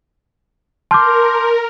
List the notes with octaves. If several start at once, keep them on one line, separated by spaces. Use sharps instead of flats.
A#4 A5 C6 D6 F6 G6